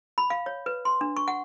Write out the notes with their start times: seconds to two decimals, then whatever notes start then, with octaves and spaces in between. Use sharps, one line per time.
0.18 B5
0.30 F5
0.46 C#5
0.66 B4
0.85 C6
1.01 D4
1.17 C#6
1.28 F#5